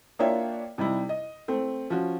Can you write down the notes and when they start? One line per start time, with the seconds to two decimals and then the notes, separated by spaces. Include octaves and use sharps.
0.19 A#3 D4 F4 C#5 E5 G5
0.78 C3 G3 D#4 E4
1.09 D#5
1.48 A3 C4
1.90 F3 C#4 F#4